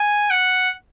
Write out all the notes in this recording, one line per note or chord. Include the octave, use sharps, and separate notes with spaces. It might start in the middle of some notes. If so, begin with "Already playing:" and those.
Already playing: G#5
F#5